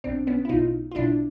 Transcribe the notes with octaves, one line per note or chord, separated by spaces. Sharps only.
B1 B2 C4 D4
B3 C#4
E4
B1 B2 D#4 F4
F4
B1 B2 D4 E4